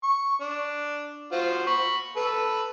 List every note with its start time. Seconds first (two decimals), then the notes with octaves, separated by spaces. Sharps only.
0.03 C#6
0.41 D4
1.32 F4 F#4 C5
1.67 B5 C#6
2.17 A4 B4